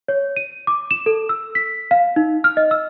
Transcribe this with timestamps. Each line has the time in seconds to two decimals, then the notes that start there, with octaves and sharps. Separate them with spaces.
0.08 C#5
0.36 D#7
0.67 D6
0.91 E7
1.06 A4
1.29 E6
1.55 B6
1.91 F5
2.16 D#4
2.44 F6
2.57 D#5
2.71 E6